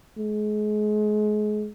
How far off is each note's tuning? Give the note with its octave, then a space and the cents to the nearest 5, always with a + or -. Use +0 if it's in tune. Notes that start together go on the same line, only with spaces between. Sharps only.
G#3 +30